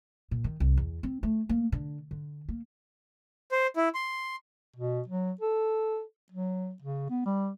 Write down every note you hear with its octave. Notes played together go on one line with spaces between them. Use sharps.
A#2
D#3
C2
E2
C4
A3
A#3
D3
D3
A#3
C5
E4
C6
B2
F#3
A4
F#3
C#3
B3
G3